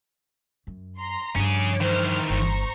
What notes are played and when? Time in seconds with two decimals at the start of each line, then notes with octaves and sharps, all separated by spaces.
0.67 F#2
0.97 A#5 C6
1.36 G2 F3 C#4 G#4 D6
1.81 D#3 E3 C5 F6
2.30 G1 C5 A#5 C#6